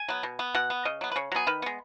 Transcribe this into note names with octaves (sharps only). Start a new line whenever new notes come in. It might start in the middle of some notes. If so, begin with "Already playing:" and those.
Already playing: G#5
F#3 B3
B2
B3
B2 F#5
B3
C#3 D#5
F#3 B3
B4
C#3 C#5
F#3 B3 G#4
D#3 B4
G#3 B3